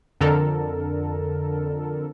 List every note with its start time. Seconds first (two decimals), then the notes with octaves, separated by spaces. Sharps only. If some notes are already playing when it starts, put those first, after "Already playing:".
0.21 F2 D3 A4 A#4